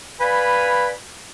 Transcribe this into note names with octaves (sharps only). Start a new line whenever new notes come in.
B4 D5 F5 G#5 B5